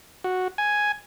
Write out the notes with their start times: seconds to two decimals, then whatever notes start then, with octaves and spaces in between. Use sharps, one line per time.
0.24 F#4
0.58 G#5